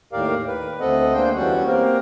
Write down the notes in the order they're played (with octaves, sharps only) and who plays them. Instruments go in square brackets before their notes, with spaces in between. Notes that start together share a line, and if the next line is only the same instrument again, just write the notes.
[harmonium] D#2 A2 G4 A#4 D5 F5
B4
D2 B3 C4 A4 D#5 F#5
G#3 A#3 D4 C5 G5
E2 G3 C#4 F#4 F#5
A#3 C4 G4 A#4